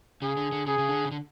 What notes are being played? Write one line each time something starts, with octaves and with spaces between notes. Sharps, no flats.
C#3 G#4
D3
D3
C#3 G#4
C#3
D3
C#3
D3